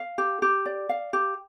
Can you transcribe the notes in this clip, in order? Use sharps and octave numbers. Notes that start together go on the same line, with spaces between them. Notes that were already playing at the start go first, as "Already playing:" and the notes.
Already playing: F5
G4
G4
D5
F5
G4